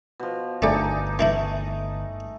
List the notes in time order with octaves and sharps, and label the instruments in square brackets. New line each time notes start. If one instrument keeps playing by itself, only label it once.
[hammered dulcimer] B2 F3
[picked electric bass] G1 [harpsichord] A3 D5 [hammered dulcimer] D4 D#4 G#5
[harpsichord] E3 D#4 E4 [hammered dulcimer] A3 D#5